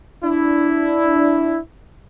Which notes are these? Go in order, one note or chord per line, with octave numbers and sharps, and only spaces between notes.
D4 E4